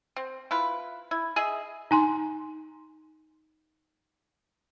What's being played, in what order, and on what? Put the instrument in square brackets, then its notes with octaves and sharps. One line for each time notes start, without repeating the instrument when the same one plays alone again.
[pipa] C4
E4 F4 B4
E4
G#4 D#5 E5
[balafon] D#4 G#5 C6